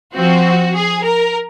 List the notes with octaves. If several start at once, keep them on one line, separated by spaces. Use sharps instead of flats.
F3 C4 F#4
G#4
A#4